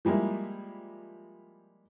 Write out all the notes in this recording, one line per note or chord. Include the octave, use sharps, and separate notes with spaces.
F3 G3 G#3 A#3 E4